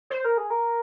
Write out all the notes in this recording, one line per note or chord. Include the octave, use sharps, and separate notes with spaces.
C5
A#4
G#4
A#4